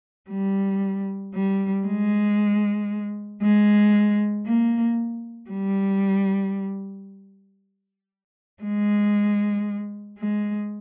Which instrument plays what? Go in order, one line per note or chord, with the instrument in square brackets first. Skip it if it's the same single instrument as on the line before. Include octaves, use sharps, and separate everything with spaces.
[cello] G3
G3
G#3
G#3
A#3
G3
G#3
G#3